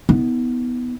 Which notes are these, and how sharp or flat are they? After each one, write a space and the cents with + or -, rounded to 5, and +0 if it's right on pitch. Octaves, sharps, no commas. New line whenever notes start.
B3 +0 D#4 +45